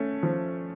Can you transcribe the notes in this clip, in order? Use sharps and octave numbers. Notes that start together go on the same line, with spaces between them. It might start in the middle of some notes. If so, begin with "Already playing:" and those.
Already playing: A3 C#4
F3